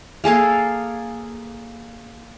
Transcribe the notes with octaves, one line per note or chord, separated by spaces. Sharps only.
A#3 G#4 A4 F5